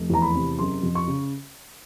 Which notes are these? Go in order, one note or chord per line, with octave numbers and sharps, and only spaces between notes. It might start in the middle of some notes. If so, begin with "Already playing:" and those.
Already playing: F1
E2 A#5
B5
C3
F#1 C6
F2
C#6
C#3